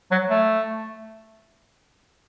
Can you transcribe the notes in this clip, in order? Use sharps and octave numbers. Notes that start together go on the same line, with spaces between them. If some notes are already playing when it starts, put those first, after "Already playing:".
F#3
A3